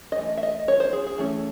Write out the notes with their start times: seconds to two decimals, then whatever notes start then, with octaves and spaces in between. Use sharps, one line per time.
0.12 D#5
0.17 E3 A3
0.37 E5
0.43 D#5
0.68 C#5
0.80 C5
0.93 G#4
1.06 G#4
1.18 E3 A3 C#4 E4